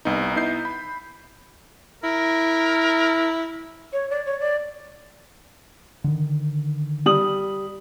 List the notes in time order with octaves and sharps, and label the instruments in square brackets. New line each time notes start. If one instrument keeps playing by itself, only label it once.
[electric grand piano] C2 B3 D#4
B3 D#4 E4 G6 C7
B5
[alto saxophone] E4 [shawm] A#4
[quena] C#5
D5
C#5
D5
[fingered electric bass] D3 D#3
[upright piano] G3 D#6 F#7